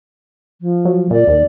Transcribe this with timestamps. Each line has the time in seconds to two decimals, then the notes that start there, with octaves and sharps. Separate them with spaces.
0.61 F3
0.85 F#3
1.11 A#2 D5
1.28 D#2